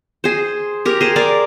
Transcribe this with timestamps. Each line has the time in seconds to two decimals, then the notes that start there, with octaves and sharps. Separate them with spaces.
0.24 G#4 C5
0.85 G4 A#4
1.01 G#4 C5
1.16 A#4 D5